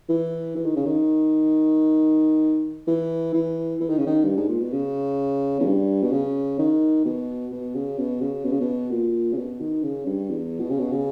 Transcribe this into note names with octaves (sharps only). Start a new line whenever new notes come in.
E3
E3
D#3
C#3
D#3
E3
E3
E3
D#3
C#3
D#3
G2
G#2
A#2
B2
C#3
E2
G2
B2
C#3
D#3
B2
B2
C#3
B2
C#3
B2
C#3
B2
A#2
C#3
B2
D#3
C#3
G2
E2
B2
C#3
B2
C#3